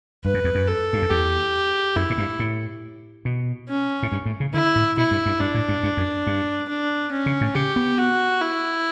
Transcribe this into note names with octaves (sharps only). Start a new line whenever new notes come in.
G2 B4
F#2
E2
F#2
A4
G2
F#2
E2 G4
F#2 E4
A2
G2
A2
B2
C#4
A2
G2
A2
C#3
D3 E4
A2
B2 E4
G2
G2
G2 D4
A2
G2
G2
F#2
G2
D4
C#4
C#3
A2
C#3 G4
B3
F#4
E4